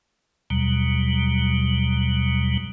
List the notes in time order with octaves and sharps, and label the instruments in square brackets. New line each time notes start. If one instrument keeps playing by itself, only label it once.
[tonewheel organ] D#2 B2 F#3 G3